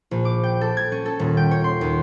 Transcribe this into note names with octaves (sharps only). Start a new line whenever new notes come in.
A#1
D6
G5
A4
G#6
C#4
A4
D#1
G5
C#5
C6
D#2